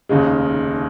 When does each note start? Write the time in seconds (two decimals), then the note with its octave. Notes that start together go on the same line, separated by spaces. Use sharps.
0.09 F1 D#2 C#3 G#3